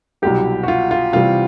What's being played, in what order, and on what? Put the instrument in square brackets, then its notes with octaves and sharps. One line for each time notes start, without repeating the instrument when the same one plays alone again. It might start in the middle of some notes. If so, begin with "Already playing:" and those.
[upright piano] C2 B2 F#3 [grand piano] G4
[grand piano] F#4
F4
F4
[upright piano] C3 E3 G3 [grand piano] F4